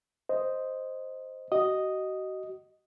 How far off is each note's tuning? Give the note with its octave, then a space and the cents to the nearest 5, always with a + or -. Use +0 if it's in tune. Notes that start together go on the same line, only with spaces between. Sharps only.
C5 +0 D#5 +0
F#4 +35 D#5 +0